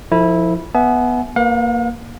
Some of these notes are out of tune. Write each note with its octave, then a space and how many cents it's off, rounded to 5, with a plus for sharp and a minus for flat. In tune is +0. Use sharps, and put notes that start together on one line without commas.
F3 +0 E4 -15 A4 +30
B3 +0 E5 +0 G#5 +45
A#3 +0 B4 +0 F5 +45